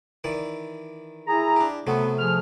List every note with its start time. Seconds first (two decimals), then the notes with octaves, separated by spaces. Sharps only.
0.24 D#3 E3 D5
1.28 E4 G#4 A#5
1.56 D4 G4
1.87 C3 F#3 A3 B3
2.19 F3 G#4 F6